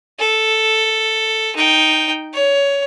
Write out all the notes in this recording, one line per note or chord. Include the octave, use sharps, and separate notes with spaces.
A4
D#4 G5
C#5